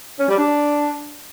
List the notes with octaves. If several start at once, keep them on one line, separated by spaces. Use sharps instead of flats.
C#4
G3
D4